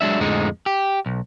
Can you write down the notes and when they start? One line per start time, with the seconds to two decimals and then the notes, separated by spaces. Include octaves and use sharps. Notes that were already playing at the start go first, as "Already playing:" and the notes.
0.01 F#3 G#3 D4 E5
0.20 F2 A2 D3 F3 G#3 D#4
0.66 G4
1.06 B1